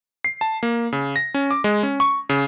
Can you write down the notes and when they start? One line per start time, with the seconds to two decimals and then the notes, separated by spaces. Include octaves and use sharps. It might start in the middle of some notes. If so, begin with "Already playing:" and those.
0.25 C7
0.41 A5
0.63 A#3
0.92 C#3
1.16 A#6
1.34 C#4
1.51 D6
1.64 G#3
1.83 C#4
2.00 C#6
2.29 C#3